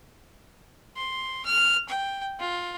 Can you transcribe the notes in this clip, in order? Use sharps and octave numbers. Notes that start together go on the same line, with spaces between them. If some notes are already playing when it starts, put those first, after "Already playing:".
C6
F6
G5
F4